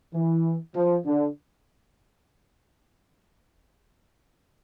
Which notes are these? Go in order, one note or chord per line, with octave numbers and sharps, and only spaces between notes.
E3
F3
D3